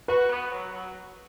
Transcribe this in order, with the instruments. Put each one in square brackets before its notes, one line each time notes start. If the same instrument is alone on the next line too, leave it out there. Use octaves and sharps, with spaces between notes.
[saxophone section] F#4 [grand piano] B4
[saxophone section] B3
F#3
F#3